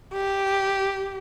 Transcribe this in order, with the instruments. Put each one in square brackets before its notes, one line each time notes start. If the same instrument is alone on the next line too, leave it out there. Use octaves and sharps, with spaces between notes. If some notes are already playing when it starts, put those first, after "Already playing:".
[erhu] G4